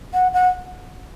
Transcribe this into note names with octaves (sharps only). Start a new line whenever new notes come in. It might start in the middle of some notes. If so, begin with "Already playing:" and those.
F#5
F#5